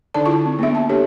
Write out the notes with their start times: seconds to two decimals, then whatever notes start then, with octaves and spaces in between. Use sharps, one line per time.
0.14 D3 D4 D#4 A4 D5 A5
0.26 E4 F4 G#4 A5 C#6
0.46 C4
0.59 A#3 B3 D4 G#4 E5
0.75 A5
0.89 D4 G4 A4 C#5